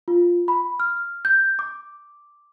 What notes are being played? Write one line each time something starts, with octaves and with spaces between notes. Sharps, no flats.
F4
B5
F6
G6
D6